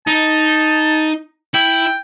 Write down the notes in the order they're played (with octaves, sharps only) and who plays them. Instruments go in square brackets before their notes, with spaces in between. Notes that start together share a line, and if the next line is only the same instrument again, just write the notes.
[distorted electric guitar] D#4 [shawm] A5
[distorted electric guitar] E4 [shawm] G5